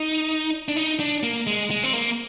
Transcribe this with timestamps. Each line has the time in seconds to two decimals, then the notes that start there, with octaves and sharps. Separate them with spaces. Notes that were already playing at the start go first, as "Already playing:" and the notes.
Already playing: D#4
0.68 D4
0.76 D#4
1.00 D4
1.23 A#3
1.47 G#3
1.71 G#3
1.84 C4
1.93 A#3